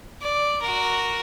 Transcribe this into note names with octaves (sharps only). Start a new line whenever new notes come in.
D5
F#4 A#4